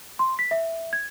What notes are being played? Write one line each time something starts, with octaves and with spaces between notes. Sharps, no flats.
C6
B6
E5
G#6